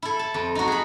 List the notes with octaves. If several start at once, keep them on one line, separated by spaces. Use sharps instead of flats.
E4 A4
A5
F2
D#4 F#4
G#4 B5